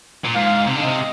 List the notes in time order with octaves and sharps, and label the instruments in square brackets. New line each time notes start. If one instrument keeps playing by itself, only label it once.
[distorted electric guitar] A#2
[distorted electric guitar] G#2 [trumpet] F5
[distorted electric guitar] C3
D3
[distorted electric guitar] C3 [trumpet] D#5